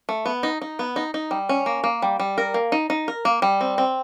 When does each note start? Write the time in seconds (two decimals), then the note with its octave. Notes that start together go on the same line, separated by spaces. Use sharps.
0.09 A3
0.26 B3
0.43 D#4
0.61 D#4
0.79 B3
0.96 D#4
1.14 D#4
1.31 G3
1.49 C#4
1.66 A#3
1.84 A#3
2.02 G3
2.19 G3
2.38 A#4
2.54 A#3
2.72 D#4
2.90 D#4
3.08 A#4
3.25 A#3
3.42 G3
3.61 C4
3.78 C4